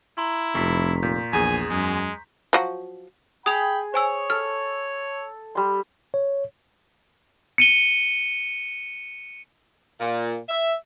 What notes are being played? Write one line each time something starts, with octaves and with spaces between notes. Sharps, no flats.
E4 A#5 C6
F1 F2 C#6 B6
A#2 G6 B6
A#1 E2 G#4 G#5
F#2 G#3
F3 F#3 F#4
G#4 G5 B5 D#6 F7
C5 C#5 G#5 E6
A4 F6
G3 C6
C#5
C#7 D#7 G7
A#2
E5